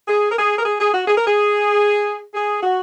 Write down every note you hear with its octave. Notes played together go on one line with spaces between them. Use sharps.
G#4
A#4
G#4
A#4
G#4
G#4
F#4
G#4
A#4
G#4
G#4
F#4